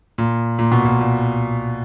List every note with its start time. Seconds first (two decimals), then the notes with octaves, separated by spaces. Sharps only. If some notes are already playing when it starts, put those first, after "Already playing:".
0.18 A#2
0.59 A#2
0.72 B2
0.85 A#2
1.00 A#2